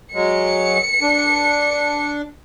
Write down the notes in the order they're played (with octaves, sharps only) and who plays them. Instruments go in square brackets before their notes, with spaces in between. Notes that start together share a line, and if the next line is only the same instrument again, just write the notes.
[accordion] F#3 G#3 [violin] C#7
[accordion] D4